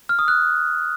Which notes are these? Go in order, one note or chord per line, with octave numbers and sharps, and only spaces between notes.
F6
D#6
F#6